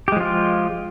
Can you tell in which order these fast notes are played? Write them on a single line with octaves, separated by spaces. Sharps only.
G4 G#3 F3 F4